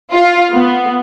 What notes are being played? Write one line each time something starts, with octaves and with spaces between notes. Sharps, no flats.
F4
B3